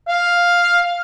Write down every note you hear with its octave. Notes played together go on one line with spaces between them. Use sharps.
F5